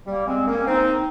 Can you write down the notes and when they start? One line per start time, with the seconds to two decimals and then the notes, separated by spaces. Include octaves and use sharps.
0.07 G3 A#3
0.27 G#3 C4
0.47 A#3 C#4
0.67 C4 D#4